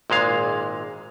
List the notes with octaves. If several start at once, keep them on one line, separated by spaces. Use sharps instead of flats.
G#1 A#2 G#3 F5